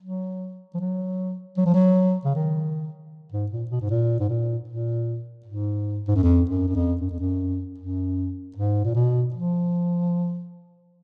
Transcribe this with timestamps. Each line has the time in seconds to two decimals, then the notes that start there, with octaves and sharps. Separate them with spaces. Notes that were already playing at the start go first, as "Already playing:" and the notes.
0.02 F#3
0.74 F3
0.80 F#3
1.58 F#3
1.66 F3
1.74 F#3
2.25 C#3
2.35 D#3
3.32 G#2
3.51 A#2
3.71 B2
3.81 G#2
3.90 A#2
4.20 G#2
4.29 A#2
4.68 A#2
5.46 G#2
6.08 G#2
6.15 F#2
6.23 F2
6.50 F#2
6.68 F#2
6.75 F2
7.01 F#2
7.10 F2
7.20 F#2
7.79 F#2
8.56 G#2
8.84 A#2
8.95 B2
9.34 F3